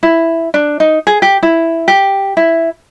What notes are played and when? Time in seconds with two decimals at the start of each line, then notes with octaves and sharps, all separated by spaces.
0.03 E4
0.54 D4
0.80 D#4
1.07 G#4
1.22 G4
1.43 E4
1.88 G4
2.37 E4